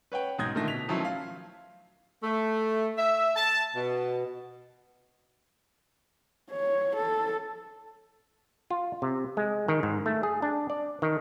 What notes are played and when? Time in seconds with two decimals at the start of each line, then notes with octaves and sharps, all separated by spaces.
0.12 B4 C#5 F#5 G5
0.39 B1 G#2 D#6 G6 G#6 A#6
0.55 A#2 D3 D#3 A3 A#6
0.68 B2 B6 F7
0.88 D#3 F3 F#3 A3 C#4 E4
1.05 F5
2.23 A3
2.97 E5
3.36 A5
3.75 B2
6.51 C#5
6.96 A4
8.70 F4
9.02 C3
9.37 G#3
9.68 D#3
9.83 G#2
10.06 A3
10.23 G#4
10.42 D4
10.70 D5
11.02 D#3